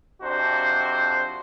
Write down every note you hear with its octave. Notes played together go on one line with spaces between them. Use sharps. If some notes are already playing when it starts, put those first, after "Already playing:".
F2 C3 D4 F#4 C5